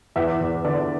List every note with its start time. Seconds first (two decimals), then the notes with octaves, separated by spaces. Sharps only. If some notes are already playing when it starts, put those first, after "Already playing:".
0.16 E2 E5
0.41 E2
0.65 D3 D5